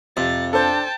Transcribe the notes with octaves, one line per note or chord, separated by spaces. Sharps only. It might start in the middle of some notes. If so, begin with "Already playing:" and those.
F2 C3 A6
D4 A4 C5 G5 A5